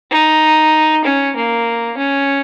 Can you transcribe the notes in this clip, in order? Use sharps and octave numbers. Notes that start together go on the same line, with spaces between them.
D#4
C#4
A#3
C#4